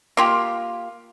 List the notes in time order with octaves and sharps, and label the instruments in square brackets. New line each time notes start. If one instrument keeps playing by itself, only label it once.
[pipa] A#3 F4 G4